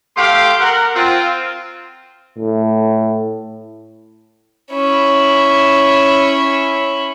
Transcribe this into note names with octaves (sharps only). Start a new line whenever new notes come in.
A3 G4 F5 C6 D6
A#4 F#5
C4 F4
A2
C#4 E4